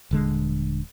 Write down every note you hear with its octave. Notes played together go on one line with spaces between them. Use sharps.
D#1 D3 G#3